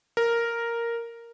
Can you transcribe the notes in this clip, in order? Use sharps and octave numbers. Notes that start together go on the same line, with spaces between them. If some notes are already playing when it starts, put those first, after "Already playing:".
A#4